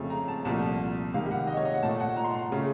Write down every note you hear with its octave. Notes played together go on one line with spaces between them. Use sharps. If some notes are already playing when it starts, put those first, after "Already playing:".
Already playing: F2 C#3 A3
A#5
A5
C2 A#2 F3 A3 A5
C#2 C3 D#3 A#3 F5
F#5
D#5
C#5
D#5
F#5
A#2 A3 A5
F#5
A#5
C6
A#5
C#3 A3